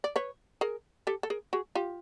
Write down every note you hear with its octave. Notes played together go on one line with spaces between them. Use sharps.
D5
B4 C#5
G#4 A#4
G4 A4
A4
G#4 A#4
F#4 G#4
F4 G4